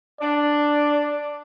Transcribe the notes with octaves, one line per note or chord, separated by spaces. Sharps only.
D4 D5